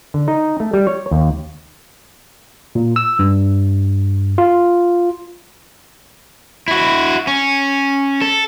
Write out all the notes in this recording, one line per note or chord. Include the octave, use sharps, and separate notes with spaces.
D3
D#4
A3
G3
C#5
D#2
A#2
E6
G2
F4
E4 F#4
C#4
A4